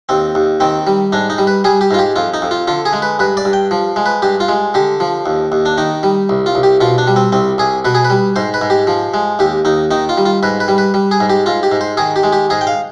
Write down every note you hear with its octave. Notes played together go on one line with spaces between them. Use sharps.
D#2 C4
D#2
D#3 C4
G3
G#2 D4
D#4
G3
B4
G3 G#4
G4
G#2 F4
G4
F2 F4
D#4
F2
F4
D3 F4
G#4
G#3
B4
G2 B4
D5
G2
G5
F3
G#3
B4
G2 G4
F4
G#3
D3 G4
F3
D#2
D#2
D4
D#3 D#4
G3
C2
F4
C2
G4
B2 F4
D4
G3
C4
C2 C4
C2 G#4
B2 B4
G#4
B4
G3
G#2 C5
B4
G#2
G4
F3
G#3
D#2 G4
D#2 D#4
D#3 D#4
F4
G3
F4
G#2 B4
B4
G3
B4
G3
G#4
G#2
G4
G#2 F4
G4
G#2
C5
D#3 G#4
G4
G#3
G4
G#2 G#4
G5
F5